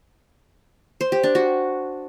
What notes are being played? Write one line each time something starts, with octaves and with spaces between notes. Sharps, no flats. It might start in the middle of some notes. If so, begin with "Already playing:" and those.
C5
G4
D4
F#4